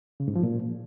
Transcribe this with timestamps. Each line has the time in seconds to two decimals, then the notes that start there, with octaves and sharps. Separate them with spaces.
0.20 C#3
0.28 G#2
0.36 F3
0.43 A#2